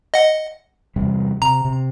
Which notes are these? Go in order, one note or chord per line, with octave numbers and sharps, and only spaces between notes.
D#5 F#5
E2 C3 G3
C3 A#5
C3